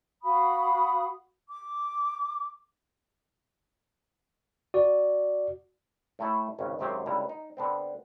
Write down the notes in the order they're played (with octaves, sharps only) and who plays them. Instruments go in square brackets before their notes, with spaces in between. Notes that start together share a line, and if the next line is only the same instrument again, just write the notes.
[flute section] F#4 F5 B5 D#6
D6
[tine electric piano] F#4 D5
[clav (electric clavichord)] A2 A3 E4 A4
G#1 C#2 C#4
G#1 F#2 F#3 C4 G4
C#2 D3 G3 E4 A#5
D#4
D3 B3 C4